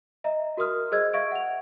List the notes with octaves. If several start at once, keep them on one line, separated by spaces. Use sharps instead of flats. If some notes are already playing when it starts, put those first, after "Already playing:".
D#5 E5 A#5
F#4 A#4 C6 D#6 F6
G#4 C5 D#5 E6 F#6 G#6
E5 F5 C#6 G#6 D7
F#5 F7